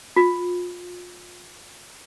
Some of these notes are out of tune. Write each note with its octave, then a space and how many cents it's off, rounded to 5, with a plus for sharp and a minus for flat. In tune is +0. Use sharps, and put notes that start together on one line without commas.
F4 +30